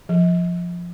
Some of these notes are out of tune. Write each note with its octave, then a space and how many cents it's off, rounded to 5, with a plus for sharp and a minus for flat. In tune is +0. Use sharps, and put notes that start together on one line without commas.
F3 +0